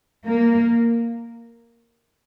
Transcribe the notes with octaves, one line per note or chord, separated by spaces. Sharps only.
A#3